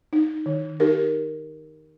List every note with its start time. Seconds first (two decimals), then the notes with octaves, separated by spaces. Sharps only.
0.13 D#4
0.46 D#3
0.80 D#4 G4 A#4